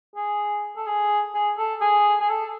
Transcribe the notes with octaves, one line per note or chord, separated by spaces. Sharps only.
G#4
A4
G#4
G#4
A4
G#4
G#4
A4